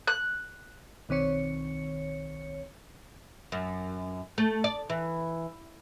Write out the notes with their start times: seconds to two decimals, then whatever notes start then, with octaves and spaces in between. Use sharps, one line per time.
0.07 F#6
1.09 B1 D#3 C4 C#5 C#7
3.52 F#2
4.38 A3
4.64 D5
4.90 E3